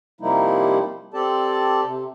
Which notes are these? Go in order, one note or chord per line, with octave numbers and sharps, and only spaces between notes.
C3 F3 G3 A#3 D#4 E4
C4 G4 A4 D5 A5
C3